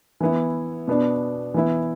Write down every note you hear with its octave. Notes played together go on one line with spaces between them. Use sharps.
E3 B3 E4
B2 B3 D4
E3 B3 E4